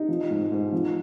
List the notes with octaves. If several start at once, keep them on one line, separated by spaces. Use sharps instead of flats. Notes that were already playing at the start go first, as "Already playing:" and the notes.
Already playing: D#4
F3
G#2
G#2
F3